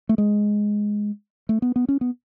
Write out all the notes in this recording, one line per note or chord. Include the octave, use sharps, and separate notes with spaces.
A3
G#3
A3
B3
B3
C#4
B3